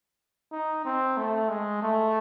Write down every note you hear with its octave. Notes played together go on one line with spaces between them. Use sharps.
D#4
C4
A3
G#3
A3